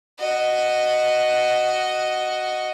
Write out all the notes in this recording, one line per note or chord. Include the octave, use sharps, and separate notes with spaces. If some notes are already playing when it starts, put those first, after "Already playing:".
F#4 D#5